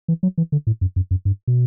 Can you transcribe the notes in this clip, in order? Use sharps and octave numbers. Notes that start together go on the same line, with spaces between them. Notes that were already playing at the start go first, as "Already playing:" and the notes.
E3
F#3
E3
D3
A2
F#2
F#2
F#2
G2
B2